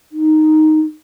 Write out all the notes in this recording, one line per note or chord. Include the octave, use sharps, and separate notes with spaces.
D#4